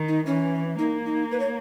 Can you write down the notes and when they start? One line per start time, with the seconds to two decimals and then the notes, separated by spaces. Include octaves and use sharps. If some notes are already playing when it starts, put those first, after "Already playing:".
Already playing: D#3
0.08 D#4
0.25 E3 C#4
0.79 A#3 D#4
1.05 D#4
1.31 B4
1.40 C#5